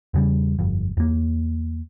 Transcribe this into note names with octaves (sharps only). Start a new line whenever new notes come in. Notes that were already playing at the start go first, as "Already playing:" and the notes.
E2 C#3 G3
G1 F2
E2 A#3